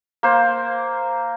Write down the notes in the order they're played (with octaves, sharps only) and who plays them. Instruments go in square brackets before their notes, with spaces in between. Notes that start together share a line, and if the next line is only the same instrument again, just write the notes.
[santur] A#3 C5